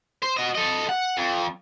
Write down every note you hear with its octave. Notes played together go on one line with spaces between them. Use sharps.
C5
F#4 D#5
A4 D#5
F#5
F2